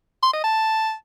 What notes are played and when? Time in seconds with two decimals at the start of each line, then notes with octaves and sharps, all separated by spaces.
0.23 C6
0.34 D#5
0.44 A5